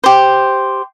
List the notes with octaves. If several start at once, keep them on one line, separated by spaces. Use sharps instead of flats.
G4 C5